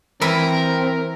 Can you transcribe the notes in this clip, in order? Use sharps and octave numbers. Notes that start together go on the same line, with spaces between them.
E3 C4 E4 A#4